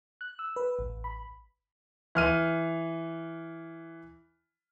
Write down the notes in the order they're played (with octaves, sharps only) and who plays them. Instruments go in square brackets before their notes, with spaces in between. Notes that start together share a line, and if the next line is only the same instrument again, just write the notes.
[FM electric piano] F#6
E6
B4
A1
B5
[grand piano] E3 F6 D#7